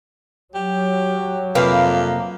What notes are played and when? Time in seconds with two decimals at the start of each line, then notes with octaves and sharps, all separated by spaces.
0.55 F#3 G4
1.55 F2 C3 A#3 B4 F5